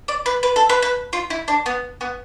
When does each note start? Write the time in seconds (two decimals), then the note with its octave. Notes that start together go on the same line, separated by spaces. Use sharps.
0.08 D5
0.26 B4
0.43 B4
0.56 A4
0.69 B4
0.82 B4
1.13 F4
1.30 E4
1.48 D4
1.66 B3
2.01 B3